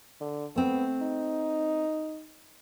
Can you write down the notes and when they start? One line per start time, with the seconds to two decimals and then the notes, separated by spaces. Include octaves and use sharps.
0.21 D3
0.56 A3 B3 C4
1.02 D#4